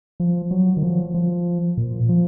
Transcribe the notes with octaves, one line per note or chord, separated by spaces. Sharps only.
F3
F#3
D#3
F3
F3
A#2
F3